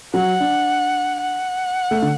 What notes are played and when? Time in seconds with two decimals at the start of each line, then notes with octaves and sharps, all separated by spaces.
0.14 F#3 F#5
0.40 D4
1.21 F#5
1.91 A3
2.02 D3